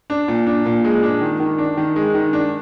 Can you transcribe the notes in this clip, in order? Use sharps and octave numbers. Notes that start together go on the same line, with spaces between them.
D4
A#2
D4
A#2
G#3
D4
D#3
D#3
D4
D#3
G#3
D#3
D4